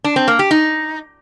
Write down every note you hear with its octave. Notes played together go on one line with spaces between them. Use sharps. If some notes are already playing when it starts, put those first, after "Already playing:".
D4
C4
A#3
G4
D#4